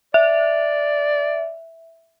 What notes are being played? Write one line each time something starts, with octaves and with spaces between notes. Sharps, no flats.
D5 E5